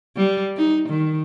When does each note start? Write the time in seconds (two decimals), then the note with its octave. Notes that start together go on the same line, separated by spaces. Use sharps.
0.17 G3
0.57 D#4
0.89 D#3